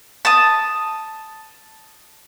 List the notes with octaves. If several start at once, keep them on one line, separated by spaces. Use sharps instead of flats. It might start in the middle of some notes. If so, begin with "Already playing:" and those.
A5 D#6